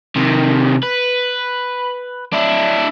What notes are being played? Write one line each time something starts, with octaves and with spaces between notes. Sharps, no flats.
C3 D#3
B4
D4 E4